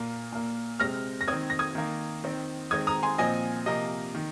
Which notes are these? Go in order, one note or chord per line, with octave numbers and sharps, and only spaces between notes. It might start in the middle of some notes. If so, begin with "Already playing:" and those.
Already playing: A#2 A#3
A#2 A#3
C3 G#3 C4 F6 A#6
A#6
D#3 C4 D#6 G#6
A#6
D#6 G#6
D#3 A#3
D#3 C4
D#3 G#3 C4 D#6 G#6
A#5 D#6
G#5 C6
A#2 F3 C4 D#5 G#5
C3 F3 A#3 D#5
D#3